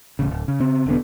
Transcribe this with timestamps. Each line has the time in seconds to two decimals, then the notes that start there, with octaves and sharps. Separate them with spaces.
0.19 D1 A1 C#3
0.31 D1
0.48 C#3
0.60 C#3 C4
0.86 E1 D3 B3